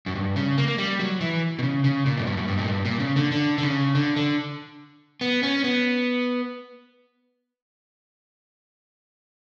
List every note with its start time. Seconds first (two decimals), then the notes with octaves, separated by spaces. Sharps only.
0.06 F#2
0.15 G2
0.36 C#3
0.58 A#3
0.68 A#3
0.78 G3
0.99 F#3
1.21 E3
1.59 B2
1.63 C#3
1.84 C#3
2.06 A#2
2.18 F#2
2.27 G2
2.37 F#2
2.48 G2
2.58 A#2
2.68 G2
2.85 A#2
3.00 C#3
3.16 D3
3.32 D3
3.58 D3
3.63 C#3
3.95 D3
4.16 D3
5.21 B3
5.43 C#4
5.64 B3